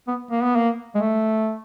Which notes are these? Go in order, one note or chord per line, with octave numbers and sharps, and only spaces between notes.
B3
A#3
B3
A#3
G#3
A3